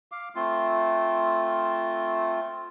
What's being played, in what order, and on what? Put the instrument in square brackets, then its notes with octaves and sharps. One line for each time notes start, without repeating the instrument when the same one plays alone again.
[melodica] F5 D6
A3 C4 F4